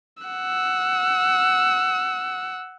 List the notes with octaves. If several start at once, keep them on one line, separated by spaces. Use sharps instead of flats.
F#5 E6